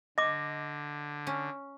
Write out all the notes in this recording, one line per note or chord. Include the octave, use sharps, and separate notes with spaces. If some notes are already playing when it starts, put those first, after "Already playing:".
D3 D#5 D6 A#6
C#4